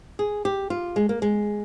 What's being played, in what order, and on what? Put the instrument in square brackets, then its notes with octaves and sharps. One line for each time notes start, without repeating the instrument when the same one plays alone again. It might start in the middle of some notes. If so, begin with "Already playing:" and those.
[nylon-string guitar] G#4
G4
F4
G#3
A#3
G#3